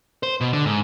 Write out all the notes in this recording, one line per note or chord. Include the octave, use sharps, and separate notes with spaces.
C5
B2
D3
G#2